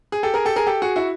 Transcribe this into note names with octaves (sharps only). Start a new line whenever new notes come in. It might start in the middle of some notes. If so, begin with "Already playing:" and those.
G#4
G4 A4
G#4 A#4
G4 A4
G#4 A#4
G4 A4
F#4 G#4
E4 F#4